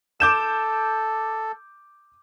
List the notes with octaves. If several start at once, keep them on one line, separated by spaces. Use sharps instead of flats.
A4 D6 G6 E7